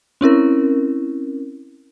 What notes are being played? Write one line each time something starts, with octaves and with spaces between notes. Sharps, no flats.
C4 C#4 E4 A#4